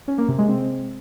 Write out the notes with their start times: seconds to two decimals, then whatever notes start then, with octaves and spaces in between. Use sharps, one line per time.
0.08 C#4
0.18 A#3
0.28 C3
0.39 G#3
0.49 C4